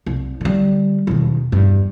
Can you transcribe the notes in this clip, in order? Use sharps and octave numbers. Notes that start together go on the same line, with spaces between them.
C2
D3 G3
E1 D#3
E2 G2